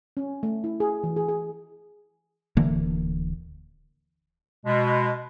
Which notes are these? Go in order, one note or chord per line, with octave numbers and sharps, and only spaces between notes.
C#4
A3
E4
G#4
E3
G#4
G#4
D1 D3 E3 A#3
B2 G#3